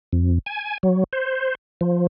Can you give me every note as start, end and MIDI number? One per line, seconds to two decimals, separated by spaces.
0.13 0.39 41
0.46 0.78 80
0.83 1.04 54
1.13 1.55 72
1.81 2.07 53